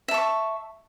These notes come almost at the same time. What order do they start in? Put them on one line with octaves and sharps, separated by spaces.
E5 A5 C#6